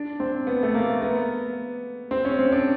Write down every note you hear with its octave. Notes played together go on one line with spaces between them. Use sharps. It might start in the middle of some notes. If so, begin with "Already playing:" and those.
Already playing: D4
C4
B3
A3
A#3
B3
C4
C#4
C4
D4